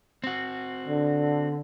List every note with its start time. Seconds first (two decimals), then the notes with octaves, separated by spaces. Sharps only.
0.24 C4 F#4
0.88 D3